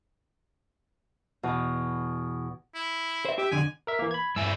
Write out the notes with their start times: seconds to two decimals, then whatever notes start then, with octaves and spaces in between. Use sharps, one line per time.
1.43 E2 B2
2.75 E4
3.25 C5 E5
3.38 G4 E5
3.52 F2 D3 G#5
3.87 A#4 E5
3.99 E3 A#3
4.11 B5 G#6
4.36 G2 E4 G#5 E6